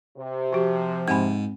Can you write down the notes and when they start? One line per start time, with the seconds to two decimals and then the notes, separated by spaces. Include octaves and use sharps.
0.17 C3
0.53 F3 F#4 G4
1.08 G#2 C4 G#5 B5